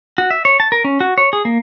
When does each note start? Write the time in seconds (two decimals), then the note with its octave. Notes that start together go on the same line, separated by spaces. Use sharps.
0.18 F#4
0.30 E5
0.45 C#5
0.60 A5
0.72 A#4
0.84 C#4
1.00 F#4
1.18 C#5
1.33 G#4
1.45 A#3